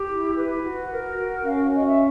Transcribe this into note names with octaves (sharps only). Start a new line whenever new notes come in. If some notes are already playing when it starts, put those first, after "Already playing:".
Already playing: G4
E4
B4
F#4
A#4
F#4
C#4 F5
C#4 D#5
E5